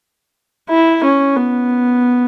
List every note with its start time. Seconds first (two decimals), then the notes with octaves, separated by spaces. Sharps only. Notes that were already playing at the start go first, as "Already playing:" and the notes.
0.69 E4
1.03 C#4
1.36 B3